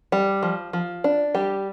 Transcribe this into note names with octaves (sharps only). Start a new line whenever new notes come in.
G3
F3
F3
D4
G3 G4